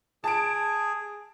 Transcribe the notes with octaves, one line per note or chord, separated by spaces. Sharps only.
G#4 A5 D7